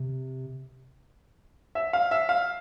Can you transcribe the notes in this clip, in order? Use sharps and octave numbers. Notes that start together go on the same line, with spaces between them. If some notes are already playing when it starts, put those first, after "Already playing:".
Already playing: C3
E5
F5
E5
F5